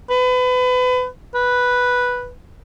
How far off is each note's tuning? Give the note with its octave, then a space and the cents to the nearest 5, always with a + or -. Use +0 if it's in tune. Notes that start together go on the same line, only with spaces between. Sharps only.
B4 +30
B4 -5